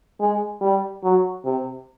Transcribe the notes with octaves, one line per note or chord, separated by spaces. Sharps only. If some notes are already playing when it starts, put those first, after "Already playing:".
G#3
G3
F#3
C3